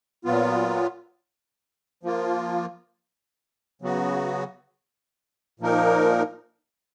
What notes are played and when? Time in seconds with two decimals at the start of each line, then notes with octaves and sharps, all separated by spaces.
0.25 A#2 F#3 B3 F4
2.03 F3 A#3 F4
3.82 C#3 F#3 B3 F#4
5.60 A#2 F3 A#3 D#4 A#4